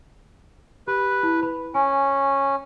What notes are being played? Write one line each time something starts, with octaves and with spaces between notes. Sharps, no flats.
G4 B4
E4
B4 B5
C#4 G#5